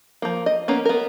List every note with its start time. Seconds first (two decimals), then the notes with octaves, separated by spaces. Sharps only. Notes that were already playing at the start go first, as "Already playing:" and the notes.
0.22 F3 A#3
0.46 D#5
0.68 A#3 B3 C#4
0.85 B3 A#4